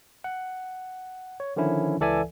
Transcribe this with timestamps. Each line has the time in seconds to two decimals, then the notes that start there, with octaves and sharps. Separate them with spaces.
0.24 F#5
1.40 C#5
1.56 D3 D#3 F3 C#4 E4
2.00 C#2 E3 A4 D5 E5 G#5